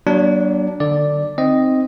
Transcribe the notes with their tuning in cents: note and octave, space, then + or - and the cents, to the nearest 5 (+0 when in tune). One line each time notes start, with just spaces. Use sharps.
F#3 +30 A#3 +35 D4 +0
D3 +20 D5 +0
C4 +0 D#4 +0 D#5 +0